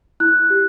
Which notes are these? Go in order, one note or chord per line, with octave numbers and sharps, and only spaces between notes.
E4 F#6
G4